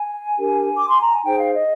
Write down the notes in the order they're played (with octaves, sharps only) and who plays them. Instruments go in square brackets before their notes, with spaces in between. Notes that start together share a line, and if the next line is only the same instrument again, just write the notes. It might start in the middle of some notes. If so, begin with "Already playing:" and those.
Already playing: [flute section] G#5
D4 G4 A#4
D6
C6
A#5
G#5
D#4 G#4 C5 G5
F5
D#5